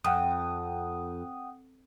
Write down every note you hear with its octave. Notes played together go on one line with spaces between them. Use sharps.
F2 F#5 G5 D#6